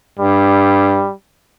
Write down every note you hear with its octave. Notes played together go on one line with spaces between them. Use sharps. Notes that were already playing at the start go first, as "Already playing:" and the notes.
G2 G3